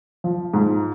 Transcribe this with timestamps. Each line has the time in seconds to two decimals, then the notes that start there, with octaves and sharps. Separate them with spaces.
0.24 F3
0.54 G#2